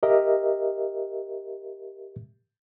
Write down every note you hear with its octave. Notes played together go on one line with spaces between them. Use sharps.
G4 A#4 D#5 E5